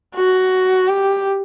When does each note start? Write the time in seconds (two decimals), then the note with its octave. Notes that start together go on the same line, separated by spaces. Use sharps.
0.15 F#4
0.88 G4